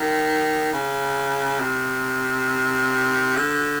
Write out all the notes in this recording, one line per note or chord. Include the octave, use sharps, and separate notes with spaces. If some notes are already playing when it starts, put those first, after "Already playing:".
Already playing: D#3
C#3
C3
D3